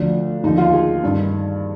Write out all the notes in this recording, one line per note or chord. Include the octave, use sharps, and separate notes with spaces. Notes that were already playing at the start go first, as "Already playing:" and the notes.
Already playing: D2 D3 F3 D4
D#2 D3 F3 D#4
F4
G#4
G2 D#3